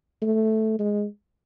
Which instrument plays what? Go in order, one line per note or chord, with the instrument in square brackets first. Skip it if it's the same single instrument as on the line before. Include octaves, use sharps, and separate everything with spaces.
[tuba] A3
G#3